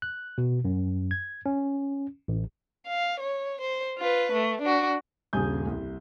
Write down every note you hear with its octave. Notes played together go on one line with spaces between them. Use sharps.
F#6
B2
F#2
G#6
C#4
A1
F5
C#5
C5
F4 B4
A3
D4 F#4
D#1 G2 C#3 G#5 D#6 G6
C2